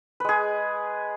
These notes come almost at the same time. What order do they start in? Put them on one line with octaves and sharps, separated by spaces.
B4 G#3 G#4